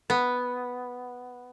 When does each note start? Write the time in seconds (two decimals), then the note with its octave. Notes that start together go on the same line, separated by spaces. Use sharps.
0.10 B3